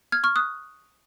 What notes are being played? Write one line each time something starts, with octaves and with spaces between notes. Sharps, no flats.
F6 G#6
C#6 F6
D#6 F#6